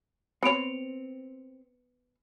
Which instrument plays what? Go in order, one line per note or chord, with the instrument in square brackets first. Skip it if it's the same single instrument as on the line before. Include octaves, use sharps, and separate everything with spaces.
[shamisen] B3 C#5 [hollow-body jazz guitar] C4 [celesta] C#7 D7 F7